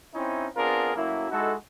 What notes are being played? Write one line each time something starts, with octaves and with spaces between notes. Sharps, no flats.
C4 C#4 D#4 E4
B3 C4 D4 F4 G#4 A#4
F#2 F#3 A3 A#3 E4
G#3 D#4 E4 F#4 A4